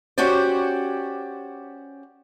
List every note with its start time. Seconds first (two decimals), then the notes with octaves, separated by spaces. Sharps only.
0.18 C#4 F#4 G4 C5 D5